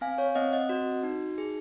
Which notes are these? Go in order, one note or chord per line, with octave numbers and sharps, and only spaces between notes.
C4 F5 G#5
C#5 F5
C4 D#5 F#5
D#5 F#5
F#4
D#4
G#4